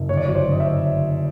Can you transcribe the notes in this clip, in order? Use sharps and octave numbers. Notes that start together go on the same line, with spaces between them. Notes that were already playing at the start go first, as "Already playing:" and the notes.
Already playing: F#1
G1 C#5
D5
F#3 C#5
C5
G1 D#5
E5